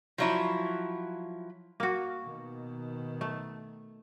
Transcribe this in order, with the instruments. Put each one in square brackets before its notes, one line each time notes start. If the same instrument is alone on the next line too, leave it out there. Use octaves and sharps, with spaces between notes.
[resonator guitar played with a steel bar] F3 F#3 E4
[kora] A#3 F#4
[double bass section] B2 D#3
[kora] A3